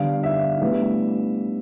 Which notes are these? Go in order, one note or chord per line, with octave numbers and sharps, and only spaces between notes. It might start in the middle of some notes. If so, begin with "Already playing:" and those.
Already playing: D3 G3 B3 D4 F5
E5
A2 G3 B3 D4